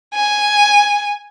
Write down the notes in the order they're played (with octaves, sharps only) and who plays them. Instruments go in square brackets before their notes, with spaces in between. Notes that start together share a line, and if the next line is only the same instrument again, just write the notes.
[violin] G#5